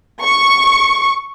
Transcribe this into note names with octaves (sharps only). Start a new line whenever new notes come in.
C#6